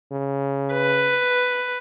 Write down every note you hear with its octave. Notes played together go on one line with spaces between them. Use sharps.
C#3
B4